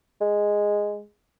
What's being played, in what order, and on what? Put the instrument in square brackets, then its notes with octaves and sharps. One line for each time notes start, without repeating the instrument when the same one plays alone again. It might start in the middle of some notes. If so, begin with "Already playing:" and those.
[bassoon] G#3